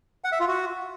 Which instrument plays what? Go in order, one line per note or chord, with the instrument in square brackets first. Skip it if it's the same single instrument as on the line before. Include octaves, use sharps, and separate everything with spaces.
[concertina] F#5
E5
F4
F#4